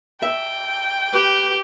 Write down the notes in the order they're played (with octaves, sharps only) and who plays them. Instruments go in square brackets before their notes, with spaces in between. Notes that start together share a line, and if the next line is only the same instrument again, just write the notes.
[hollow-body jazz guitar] E5 [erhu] G5
[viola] G4 [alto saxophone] B4